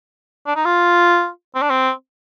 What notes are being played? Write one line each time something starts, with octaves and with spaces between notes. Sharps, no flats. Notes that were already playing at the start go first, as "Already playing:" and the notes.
D4
D#4
F4
C4
D4
C4